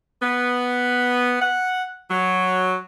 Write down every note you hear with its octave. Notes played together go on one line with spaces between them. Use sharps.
B3
F#5
F#3